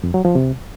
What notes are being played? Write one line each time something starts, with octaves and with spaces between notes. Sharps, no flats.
F2
F#3
F3
C3